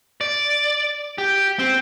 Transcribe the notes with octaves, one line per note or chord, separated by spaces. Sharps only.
D5
G4
C4